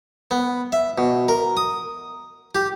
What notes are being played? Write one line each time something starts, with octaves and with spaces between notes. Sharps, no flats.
B3
E5
B2
A#4
D#6
G4